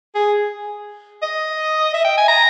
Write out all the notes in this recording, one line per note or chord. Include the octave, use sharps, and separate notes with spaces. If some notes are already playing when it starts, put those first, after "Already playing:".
G#4
D#5
E5
G5
G#5
A#5